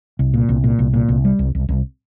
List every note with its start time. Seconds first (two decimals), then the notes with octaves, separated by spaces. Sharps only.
0.19 C2
0.34 A#2
0.49 C2
0.64 A#2
0.79 C2
0.94 A#2
1.09 C2
1.25 G3
1.39 C2
1.55 C2
1.69 C2